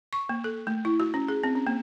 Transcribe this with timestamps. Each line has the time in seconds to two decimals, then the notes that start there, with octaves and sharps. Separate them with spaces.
0.13 C#6
0.29 A#3
0.44 A4
0.67 A3
0.85 E4
1.00 F#4
1.14 C#4
1.29 G#4
1.44 C4
1.55 C#4
1.67 A#3